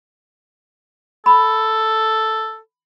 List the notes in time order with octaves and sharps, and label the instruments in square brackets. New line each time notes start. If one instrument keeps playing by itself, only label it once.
[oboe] A4 [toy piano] B5